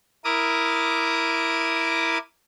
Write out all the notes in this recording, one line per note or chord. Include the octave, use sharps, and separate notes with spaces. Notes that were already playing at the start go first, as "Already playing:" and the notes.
E4 A#4 D6 D#6